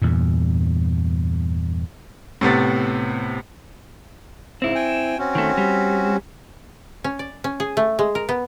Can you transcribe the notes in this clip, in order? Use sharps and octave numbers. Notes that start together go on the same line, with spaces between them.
E2 G2 A#2
A2 C3 B3 A6
G#2 C#3 C4 E4
G5 G#5
C4 C#4 F#4
D#3 A3
G3
C#4
D5
C#4
G#4
A3
G#3
A#4
B3